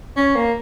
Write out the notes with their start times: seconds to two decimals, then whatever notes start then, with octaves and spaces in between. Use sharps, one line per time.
0.16 C#4
0.35 A#3